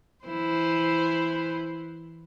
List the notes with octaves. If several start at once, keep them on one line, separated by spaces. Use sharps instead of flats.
E3 E4 C5